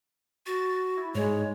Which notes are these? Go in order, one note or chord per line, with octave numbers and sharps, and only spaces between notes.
F#4 A6
E4
G#2 G#3 C#5